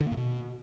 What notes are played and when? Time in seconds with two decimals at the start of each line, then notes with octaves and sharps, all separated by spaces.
0.01 D3
0.06 A#3
0.12 A2
0.17 B2